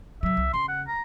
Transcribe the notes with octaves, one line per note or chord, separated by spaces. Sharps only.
C3 F#3 E5
C2
C#3 C6
F#5
A#5